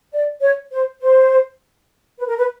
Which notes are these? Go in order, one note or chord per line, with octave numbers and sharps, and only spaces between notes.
D5
C#5
C5
C5
B4
A#4
B4